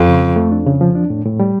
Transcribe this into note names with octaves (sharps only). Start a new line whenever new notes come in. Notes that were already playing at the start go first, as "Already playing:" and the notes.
Already playing: F2
C#3
F3
A3
D4
C#3
F3
D4
A2
A2
G3